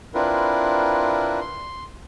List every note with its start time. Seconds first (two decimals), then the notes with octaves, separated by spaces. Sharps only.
0.14 C4 D4 E4 F4 A#4 B4
1.41 C6